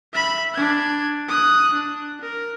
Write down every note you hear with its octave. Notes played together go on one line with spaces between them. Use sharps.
E5 B5
D4 G#6
D#6 F#6
D4
A#4